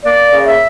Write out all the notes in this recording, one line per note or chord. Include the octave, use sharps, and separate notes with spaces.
A#3 D5
C#3
E5